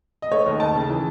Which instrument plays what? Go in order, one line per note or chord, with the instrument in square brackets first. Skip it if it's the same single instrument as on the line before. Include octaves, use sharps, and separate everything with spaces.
[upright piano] D#5
A3 C#5
D#2 D#5
D#2 A5
C#3
E3